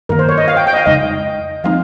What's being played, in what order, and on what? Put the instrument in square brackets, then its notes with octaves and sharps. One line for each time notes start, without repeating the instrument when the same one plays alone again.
[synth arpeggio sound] G2 D#3 A#3 [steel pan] A#4
[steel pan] C5
C#5
D#5
F5
G5
G5
D#5
F5
[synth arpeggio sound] F2 C#3 G#3 D#4 [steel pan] D#5
[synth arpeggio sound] F3 G#3 C4 D#4 [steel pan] F5